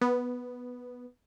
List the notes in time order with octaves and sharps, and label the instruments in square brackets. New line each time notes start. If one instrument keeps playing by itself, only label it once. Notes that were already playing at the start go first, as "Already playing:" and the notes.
[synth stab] B3